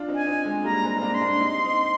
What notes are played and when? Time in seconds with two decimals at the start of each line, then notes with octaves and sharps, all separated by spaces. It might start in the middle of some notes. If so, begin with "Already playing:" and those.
Already playing: D4 F4
0.08 C4 D#4
0.15 G#5
0.27 C4 D#4
0.45 G#3 C4
0.64 G3 A#3 A#5
0.84 G#3 C4
0.90 A#5
0.97 C4
1.02 A#3 D4
1.14 C6
1.21 A#3 D4
1.40 C4 D#4
1.65 C4 D#4